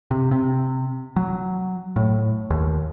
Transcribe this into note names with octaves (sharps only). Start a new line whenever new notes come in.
C3
C3
F#3
A2
D#2